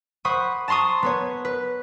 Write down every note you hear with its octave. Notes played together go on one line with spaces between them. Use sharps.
C5 F#5 B5 C#6 D#6
A5 A#5 C6 C#6 D#6
B3 B4 C#5
B4